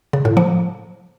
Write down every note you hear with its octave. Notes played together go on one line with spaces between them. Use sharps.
C#3
A2
F3